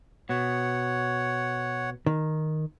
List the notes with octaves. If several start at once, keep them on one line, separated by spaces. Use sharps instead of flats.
B2 C#5 F#5
D#3